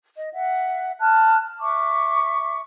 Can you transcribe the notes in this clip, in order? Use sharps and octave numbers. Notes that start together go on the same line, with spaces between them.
D#5
E5 F#5
A5 F6 F#6
E5 C#6 D6